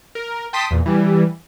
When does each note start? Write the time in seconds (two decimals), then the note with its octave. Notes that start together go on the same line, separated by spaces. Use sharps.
0.15 A#4
0.53 G5 A5 C6 D#6 B6
0.71 E2 A#2
0.86 E3 G3